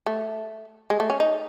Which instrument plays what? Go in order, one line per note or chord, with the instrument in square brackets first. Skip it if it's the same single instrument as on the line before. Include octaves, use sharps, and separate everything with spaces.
[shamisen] A3
G#3
A3
C#4
D#4